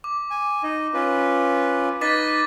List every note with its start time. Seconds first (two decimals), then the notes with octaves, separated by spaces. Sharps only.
0.04 D6
0.31 G#5
0.63 D#4 D#5
0.94 C#4 F4 B4
2.01 D#4 B4 D#5 D6 A6 B6